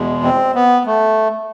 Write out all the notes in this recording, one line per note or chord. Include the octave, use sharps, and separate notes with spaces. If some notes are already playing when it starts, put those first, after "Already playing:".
Already playing: E2 B2 G#3
C4
B3
A3